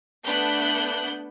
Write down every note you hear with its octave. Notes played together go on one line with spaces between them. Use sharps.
A3 B3 D4 F#5 F#6 G6